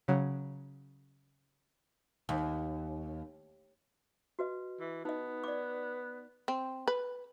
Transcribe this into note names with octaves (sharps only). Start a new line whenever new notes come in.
C#3 F#3
D#2
F#4 B4 D#5
E3
B3 D#4 D#5
D5 D6
C4
B4